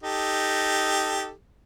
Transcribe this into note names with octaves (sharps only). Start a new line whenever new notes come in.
D#4 G4 A4